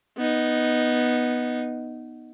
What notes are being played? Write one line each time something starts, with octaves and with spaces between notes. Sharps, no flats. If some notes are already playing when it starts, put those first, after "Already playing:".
B3 D#4